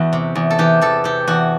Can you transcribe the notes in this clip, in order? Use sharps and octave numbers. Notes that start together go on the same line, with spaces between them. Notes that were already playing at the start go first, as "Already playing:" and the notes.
Already playing: E2 E3 F#4
C3
E2
A4
E3 G4
E2 A4
C3 G4
E2 F#4